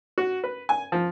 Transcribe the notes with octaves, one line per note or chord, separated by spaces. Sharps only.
F#4
B4
G#5
F3